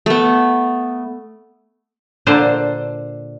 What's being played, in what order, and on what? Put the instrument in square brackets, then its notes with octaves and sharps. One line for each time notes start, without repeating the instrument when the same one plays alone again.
[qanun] A3 B3
[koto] A#2 D3 C5 A5